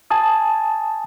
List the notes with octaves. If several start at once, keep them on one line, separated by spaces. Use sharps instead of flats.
G#5 A5 D#6